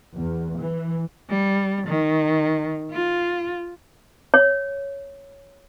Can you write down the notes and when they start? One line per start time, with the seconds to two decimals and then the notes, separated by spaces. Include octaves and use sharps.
0.15 E2
0.58 E3
1.29 G3
1.87 D#3
2.91 F4
4.34 C#5